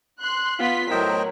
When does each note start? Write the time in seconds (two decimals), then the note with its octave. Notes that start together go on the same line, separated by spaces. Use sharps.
0.20 C6 F#6
0.60 B3 F4 C6 B6
0.91 A2 F#3 E4 A#4 C5 D#5 G5